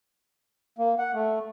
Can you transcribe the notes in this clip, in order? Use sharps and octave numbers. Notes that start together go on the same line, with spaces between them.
A#3
F#5
A3